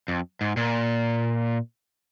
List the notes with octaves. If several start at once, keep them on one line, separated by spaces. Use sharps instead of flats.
F2
G#2
A#2